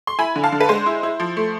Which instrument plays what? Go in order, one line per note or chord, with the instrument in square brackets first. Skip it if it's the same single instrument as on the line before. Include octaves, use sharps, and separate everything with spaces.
[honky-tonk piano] C6
E4 G#5 B5
D3
F5 A5
D3
B4
G#3 C5
E4
E4
F3
A3